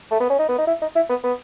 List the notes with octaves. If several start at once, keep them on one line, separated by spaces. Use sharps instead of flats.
A3
B3
C#4
D#4
B3
D#4
E4
D#4
E4
B3
B3